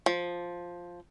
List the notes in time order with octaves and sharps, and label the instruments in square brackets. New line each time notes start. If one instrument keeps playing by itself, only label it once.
[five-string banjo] F3